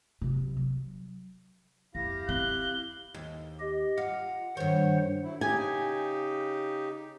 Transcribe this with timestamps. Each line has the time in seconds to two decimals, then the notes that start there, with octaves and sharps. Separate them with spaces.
0.21 C3 F#3
0.57 F#3
1.95 F2 E4 G4 F5 A#6
2.29 C4 F#6 G7
3.14 D#2
3.60 G4 D#5
3.98 F4 F#5
4.57 G2 D#3 C5 C#5 F#5
5.24 F#3 E4
5.41 C#3 D#4 G4 G#5